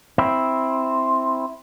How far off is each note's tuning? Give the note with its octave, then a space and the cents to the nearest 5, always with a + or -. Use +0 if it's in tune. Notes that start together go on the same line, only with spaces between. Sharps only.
C4 +0 E4 -5